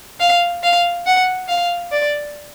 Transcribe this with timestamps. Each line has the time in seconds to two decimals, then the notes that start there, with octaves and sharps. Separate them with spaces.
0.20 F5
0.63 F5
1.06 F#5
1.49 F5
1.92 D5